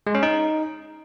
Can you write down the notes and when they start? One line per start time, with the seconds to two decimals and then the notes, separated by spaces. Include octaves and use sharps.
0.07 G#3
0.15 C#4
0.23 D#4